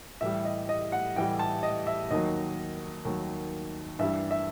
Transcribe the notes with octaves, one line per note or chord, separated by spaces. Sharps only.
A2 E3 G3 E5
D#5
D#5
F#5
A2 E3 G3 G5
A5
D#5
E5
D#2 D#3 F#3 D#5
D#2 D#3 F#3
G2 E3 G3 E5
E5